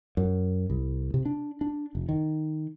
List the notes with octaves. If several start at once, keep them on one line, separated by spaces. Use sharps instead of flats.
F#2
C2
C3
D4
D4
F1
D#3